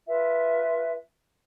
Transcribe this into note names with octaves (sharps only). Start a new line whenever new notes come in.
F4 B4 E5